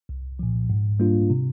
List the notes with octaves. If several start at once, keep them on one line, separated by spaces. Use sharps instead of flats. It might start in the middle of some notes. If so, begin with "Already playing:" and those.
C2
A#2 F3
G#2
G3 A#3 D4 F4
C3